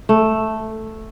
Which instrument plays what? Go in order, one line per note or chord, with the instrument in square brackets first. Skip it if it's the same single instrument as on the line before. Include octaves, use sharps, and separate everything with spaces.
[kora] A3